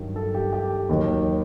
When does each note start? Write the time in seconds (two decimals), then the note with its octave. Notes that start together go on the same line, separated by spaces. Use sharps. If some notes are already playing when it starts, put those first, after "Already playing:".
Already playing: G2 D#3 F#3
0.16 A4
0.35 G4
0.53 G4
0.89 D#2 D#3 F#3